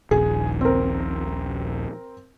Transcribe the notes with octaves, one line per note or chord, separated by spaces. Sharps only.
D#1 A#1 G#4
C4 A#4